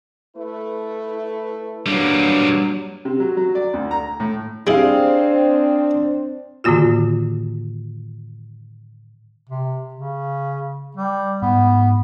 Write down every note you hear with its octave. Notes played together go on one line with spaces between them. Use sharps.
A3 E4 B4
G2 F#3 G3 A#3
C3
F#3
F#3
D5
D2
A#5
A2
G3 C4 D4 E4 G#4 F5
A2 D3 D#3 A#3 F4 F#4
C3
C#3
G3
G#2 B3